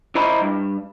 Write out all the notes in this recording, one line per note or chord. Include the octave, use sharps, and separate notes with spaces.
E4 C5 D#5 A#5 B5
G2